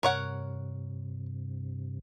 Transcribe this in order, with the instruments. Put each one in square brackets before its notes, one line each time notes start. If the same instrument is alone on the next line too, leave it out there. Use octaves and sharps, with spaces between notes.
[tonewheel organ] G2 C3 [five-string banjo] A#4 C#5 F#5